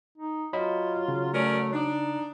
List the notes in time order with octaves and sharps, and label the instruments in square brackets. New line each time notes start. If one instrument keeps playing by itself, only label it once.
[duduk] D#4
[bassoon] F#3 [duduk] F4 [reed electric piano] D#5 B5
[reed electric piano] C#3
[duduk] A3 [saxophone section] C#4 A#4 D5
[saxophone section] D4 [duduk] D#4